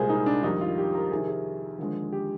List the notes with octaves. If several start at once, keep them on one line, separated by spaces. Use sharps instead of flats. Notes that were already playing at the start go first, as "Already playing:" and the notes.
Already playing: C2 A#2 G#3 G#4 C5
D#4
D4
F2 D#3 G3 D#4
F4
G4
A#4
F2 C3 D#3 G#4
G#4
D#2 D3 F3 G#3
G4